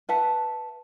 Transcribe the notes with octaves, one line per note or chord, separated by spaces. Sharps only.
B4 E5 F#5 A5